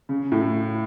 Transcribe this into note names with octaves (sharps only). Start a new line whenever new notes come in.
C#3
A2